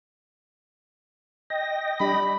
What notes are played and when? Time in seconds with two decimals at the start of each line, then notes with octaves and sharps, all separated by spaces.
1.50 D#5 G5 A#6
2.00 G3 D4 G4 B5